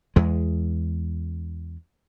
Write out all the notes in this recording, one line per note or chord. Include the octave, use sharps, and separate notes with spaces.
E2 G#3